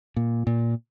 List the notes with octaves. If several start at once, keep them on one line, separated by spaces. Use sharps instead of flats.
A#2
A#2